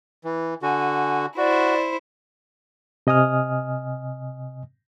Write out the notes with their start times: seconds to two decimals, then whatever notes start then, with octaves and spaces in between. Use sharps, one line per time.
0.24 E3
0.62 D3 F#4 G#5
1.38 E4 F#4 C5 D5
3.07 C3 D#5 G#5 D#6 F6